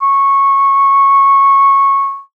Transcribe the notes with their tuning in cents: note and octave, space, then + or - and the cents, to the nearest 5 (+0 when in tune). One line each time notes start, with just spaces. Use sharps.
C#6 -15